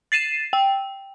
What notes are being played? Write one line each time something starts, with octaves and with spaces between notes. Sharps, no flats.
A6 C7 D#7 E7
G5